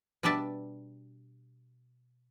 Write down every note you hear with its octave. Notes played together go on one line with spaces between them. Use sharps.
B2 G3 D4 D5 E5 A5